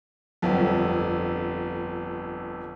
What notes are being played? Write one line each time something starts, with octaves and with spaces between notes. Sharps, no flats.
G1 F2